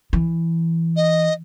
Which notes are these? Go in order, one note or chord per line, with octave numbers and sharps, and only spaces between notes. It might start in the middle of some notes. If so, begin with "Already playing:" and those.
E3
D#5